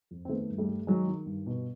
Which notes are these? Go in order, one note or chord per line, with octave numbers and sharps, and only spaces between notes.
F2
C4
D#3 A3 B3
G2
G3 A3
G2
D#3 F#3 G#3
D#3
G2
B2